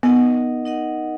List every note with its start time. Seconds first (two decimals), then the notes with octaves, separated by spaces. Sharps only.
0.03 B3 D#4 A#4 D#5 F#5
0.65 D#4 A#4 D#5 F#5